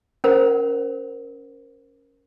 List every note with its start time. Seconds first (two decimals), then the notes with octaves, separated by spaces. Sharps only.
0.24 C#4 A#4 C5 F#5 A#5